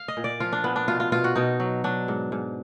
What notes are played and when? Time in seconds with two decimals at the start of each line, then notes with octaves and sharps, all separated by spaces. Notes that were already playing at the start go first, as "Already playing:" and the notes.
Already playing: F5
0.08 D#5
0.17 A#2
0.24 D5
0.40 F3 F4
0.52 D4
0.64 A#2 B3
0.76 D4
0.88 B2 F4
1.00 F4
1.12 B2 F4
1.24 F#4
1.35 B2 D#4
1.60 F#3
1.84 F#3 D4
2.08 G#2
2.32 G#2